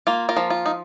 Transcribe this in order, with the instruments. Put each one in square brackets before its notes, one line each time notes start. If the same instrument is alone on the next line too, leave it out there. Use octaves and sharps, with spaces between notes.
[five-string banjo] A#3 F4
F4 A#4
F3
F4
D#4